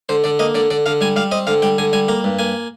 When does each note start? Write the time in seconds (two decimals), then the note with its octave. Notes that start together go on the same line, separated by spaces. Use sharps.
0.09 D3 C5
0.24 D3 D5
0.39 A#3 D#5
0.55 D3 D5
0.70 D3 D5
0.86 D3 F5
1.01 G3 G#5
1.16 G3 F5
1.32 C4 D#5
1.47 D3 F5
1.62 G3 G5
1.78 D3 G#5
1.93 G3 G#5
2.08 A#3 A#5
2.24 G2
2.39 A#3 G#5